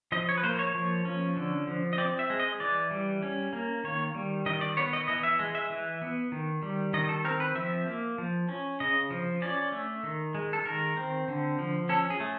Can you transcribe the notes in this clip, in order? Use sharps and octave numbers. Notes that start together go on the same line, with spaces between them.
F3 D#5
C#5
B4
A#3 C5
C#5
F3
C#4
D3
F3
D#5
C4 D5
E5
G#3
D#5
E3 D5
G3
C#4
A#3
D#3 C#5
G3
D#3 D#5
D5
B3 C#5
D#5
E3 D#5
E5
G#3
E5
E3
B3
D#3
G3
D#3 D#5
A4
C4 A#4
B4
F3 E5
A#3
F3
C#4
C#3 D#5
F3
C#4 D5
A3
D#3
G#3
A4
D#3 A#4
C4
D3
F3
C#4 A4
G#4
A3